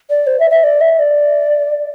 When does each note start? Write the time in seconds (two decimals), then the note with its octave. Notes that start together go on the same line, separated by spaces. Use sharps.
0.10 D5
0.27 C5
0.40 E5
0.51 E5
0.63 D5
0.81 E5
0.99 D5